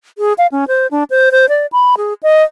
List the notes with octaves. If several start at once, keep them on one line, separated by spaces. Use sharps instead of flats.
G#4
F5
C#4
C5
D4
C5
C5
D5
B5
G#4
D#5